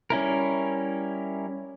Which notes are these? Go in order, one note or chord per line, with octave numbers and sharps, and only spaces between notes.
G3 C#4 E4 A#4